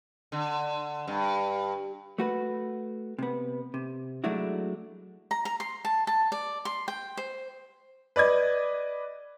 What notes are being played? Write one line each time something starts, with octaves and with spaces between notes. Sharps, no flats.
D3
G2
A3 F#4 B4
C3 B3
C3
F#3 G#3 A3 D4 E4 F#4
A#5
A#5
C6
A5
A5
D5
C6
G5
C5
B4 D5 D#5 G#6